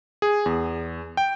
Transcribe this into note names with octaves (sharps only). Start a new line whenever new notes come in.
G#4
E2
G5